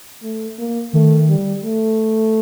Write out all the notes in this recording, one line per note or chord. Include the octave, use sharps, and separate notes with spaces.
A3
A#3
D#3 A3
G3
A3